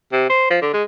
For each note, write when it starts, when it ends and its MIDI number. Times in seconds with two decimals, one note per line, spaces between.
0.12 0.28 48
0.30 0.49 72
0.50 0.58 53
0.62 0.71 50
0.73 0.83 56